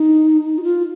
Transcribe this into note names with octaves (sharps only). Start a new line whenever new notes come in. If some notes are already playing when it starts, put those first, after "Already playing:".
Already playing: D#4
F#4
F4